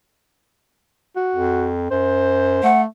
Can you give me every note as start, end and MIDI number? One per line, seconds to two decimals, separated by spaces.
1.16 1.69 66
1.35 1.88 41
1.91 2.59 42
1.91 2.68 72
2.63 2.85 57
2.63 2.81 78